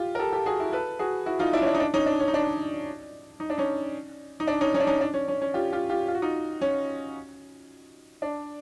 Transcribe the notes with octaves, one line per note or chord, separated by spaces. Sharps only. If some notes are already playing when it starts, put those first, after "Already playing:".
Already playing: F4 G4
A#4
G4 A4
G4 A4
F#4 G#4
E4 F#4
A4 B4
F#4 G#4
E4 F#4
D#4 F4
D4 E4
C#4
D4
D#4
D4
C#4 D#4
D4
C#4
D#4
D4
D#4
D4
C#4 D#4
D#4
D4
C#4 D#4
C#4 D#4
D4
C#4 D#4
D4
C#4
C#4
C#4
F4 G4
F4 G4
F4 G4
F4
F#4
D#4 F4
C#4
D4